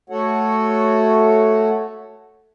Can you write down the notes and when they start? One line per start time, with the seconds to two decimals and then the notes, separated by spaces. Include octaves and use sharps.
0.10 A3 F#4 A4 C#5 F#5